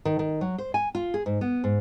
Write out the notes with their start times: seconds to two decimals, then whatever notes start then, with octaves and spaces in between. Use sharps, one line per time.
0.05 D#3
0.19 D#3
0.41 F#3
0.58 C5
0.74 G#5
0.95 F4
1.14 G#4
1.26 G#2
1.41 B3
1.64 G#2